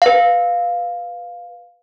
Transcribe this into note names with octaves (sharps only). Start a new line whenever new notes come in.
B4 F5